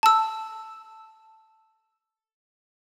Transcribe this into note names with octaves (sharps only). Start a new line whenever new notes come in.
A5 E6